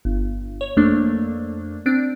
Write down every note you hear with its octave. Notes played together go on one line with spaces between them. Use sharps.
G1
C#5
F2 A3 A#3 D4
C4 D4 D7